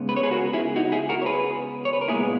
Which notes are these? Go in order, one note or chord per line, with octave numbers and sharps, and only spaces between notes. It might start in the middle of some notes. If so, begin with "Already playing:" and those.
Already playing: C#3 G#3 B3
B4
C#5
G#4 B4
F#4 A#4
E4 G#4
D#4 F#4
E4 G#4
F#4 A#4
C#5
G#4 B4
C#5
B4
A#4
A#2 G#3 B3 E4 G#4